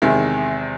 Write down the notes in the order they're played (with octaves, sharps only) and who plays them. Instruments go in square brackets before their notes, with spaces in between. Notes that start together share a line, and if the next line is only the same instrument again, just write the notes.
[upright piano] E2 C3 D#3 G#3 E5